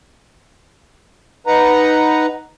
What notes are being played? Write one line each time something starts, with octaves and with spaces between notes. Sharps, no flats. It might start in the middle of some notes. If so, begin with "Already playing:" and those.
D#4 B4 F#5 A#5